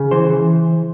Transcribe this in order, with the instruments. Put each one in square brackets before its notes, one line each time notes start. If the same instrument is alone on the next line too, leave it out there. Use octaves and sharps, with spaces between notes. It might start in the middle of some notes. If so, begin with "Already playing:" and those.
Already playing: [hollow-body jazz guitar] C#3
E3 C5
E3